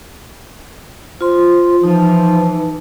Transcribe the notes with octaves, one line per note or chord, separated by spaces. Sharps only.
F4 C5 C6
E3 F3 D#4